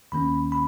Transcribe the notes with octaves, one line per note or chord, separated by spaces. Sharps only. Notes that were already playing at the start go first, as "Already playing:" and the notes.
D#2 D#3 A#3 C#4 B5
B5